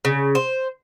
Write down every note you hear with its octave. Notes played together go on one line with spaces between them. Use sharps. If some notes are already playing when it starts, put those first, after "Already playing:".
C#3
C5